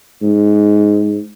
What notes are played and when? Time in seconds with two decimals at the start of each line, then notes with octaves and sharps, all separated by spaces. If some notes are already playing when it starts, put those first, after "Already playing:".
0.22 G#2